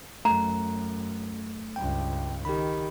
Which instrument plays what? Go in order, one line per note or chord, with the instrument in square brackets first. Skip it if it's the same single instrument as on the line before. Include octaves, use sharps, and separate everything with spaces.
[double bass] F#2 [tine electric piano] A3 [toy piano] A#5
[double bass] C#2 G2 [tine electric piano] G5
[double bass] D#3 [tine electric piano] G4 B5